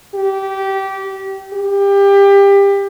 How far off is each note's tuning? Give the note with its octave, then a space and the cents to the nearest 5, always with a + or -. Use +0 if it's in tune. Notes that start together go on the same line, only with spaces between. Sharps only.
G4 -20
G4 +25